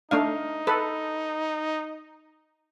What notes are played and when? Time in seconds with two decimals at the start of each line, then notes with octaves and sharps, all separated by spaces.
0.11 A3 D4 D#4 F5
0.67 A4 B4